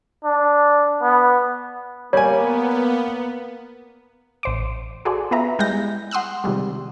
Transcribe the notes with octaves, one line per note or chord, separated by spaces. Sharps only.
D4
B3
G3 A#3 B3 C#5 G#5
A1 C5 D6
F#4 G#4 A4 C5 D5
B3 F4 G#4 B4 E5 A#5
G3 G#3 E4 G6 A#6
F#5 C6 D#6 E6 F#6
C3 D#3 F3 G3 G#3